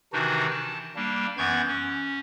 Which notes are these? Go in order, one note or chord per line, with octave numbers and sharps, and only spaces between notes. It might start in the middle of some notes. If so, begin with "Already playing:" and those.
C3 D#3 E3 D4 D#4 F#4
A5
G3 A#3 D4
F#2 E3 B3 C#6 G6 G#6
C#4